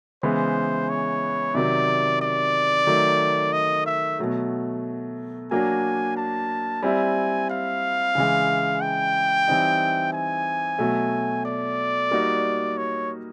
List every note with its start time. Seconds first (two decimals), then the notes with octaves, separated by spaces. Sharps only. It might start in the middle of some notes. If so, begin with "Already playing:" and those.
0.23 C#3 E3 G#3 B3 C5
0.89 C#5
1.55 C3 D#3 F#3 D5
2.22 D5
2.87 D#3 F#3 A3
3.53 D#5
3.86 E5
4.19 B2 F#3 A3
5.51 F#3 A#3 D4 F#4 G#5
6.17 A5
6.83 G3 C4 E4 G#5
7.50 F5
8.15 C#3 E3 G#3
8.81 G5
9.48 E3 G3 C4 D#4
10.13 G#5
10.79 B2 F#3 A3
11.45 D5
12.11 G3 A#3 D#4 F#4
12.77 C#5